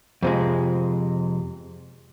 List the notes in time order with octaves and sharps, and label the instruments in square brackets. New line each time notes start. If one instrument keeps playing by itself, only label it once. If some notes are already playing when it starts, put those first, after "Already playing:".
[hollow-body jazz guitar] F2 C3 G#3